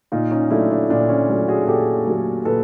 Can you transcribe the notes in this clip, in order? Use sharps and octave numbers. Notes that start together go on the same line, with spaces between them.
A#2 D#4 F4
C#4 D#4
F#3 A3 D4 E4
D4
A#2 D4
C#4
F#3 A3
F#4 G#4
A#2 G4 A4
F#3 A3
A#2 A4 B4